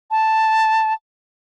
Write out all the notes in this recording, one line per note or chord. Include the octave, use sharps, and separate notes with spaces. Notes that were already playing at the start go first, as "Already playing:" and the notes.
A5